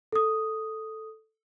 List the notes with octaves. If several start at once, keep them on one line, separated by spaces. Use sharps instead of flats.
A4 D#6